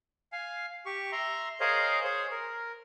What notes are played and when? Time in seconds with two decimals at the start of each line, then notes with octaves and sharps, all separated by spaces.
0.32 F5 G#5
0.86 G4 C#6
1.12 E5 A#5 C6
1.60 G#4 A#4 C5 C#5 D#5 F5
2.04 G#4 C5 C#5
2.31 A#4